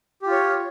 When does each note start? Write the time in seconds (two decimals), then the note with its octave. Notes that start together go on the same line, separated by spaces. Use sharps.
0.22 G4
0.27 F4
0.31 C#5